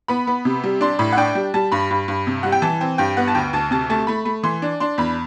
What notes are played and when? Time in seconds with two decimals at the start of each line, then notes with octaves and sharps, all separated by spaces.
0.08 B3 B5
0.27 B3
0.45 C3
0.64 G3
0.81 D4 C6
0.99 A2 B5
1.13 F#5
1.17 D4 G5
1.35 G3
1.54 G3 A5
1.72 G2 B5
1.90 G2
2.08 G2
2.27 C3
2.43 G3 F#5
2.52 G5
2.62 E3 A5
2.81 C4
2.98 G2 G5
3.17 B3 F#5
3.28 A5
3.35 D2 G5
3.53 D2 A5
3.71 C3 A5
3.90 A3 A5
4.07 A3 B5
4.25 A3
4.43 E3 C6
4.62 D4
4.80 D4 C6
4.98 E2 B5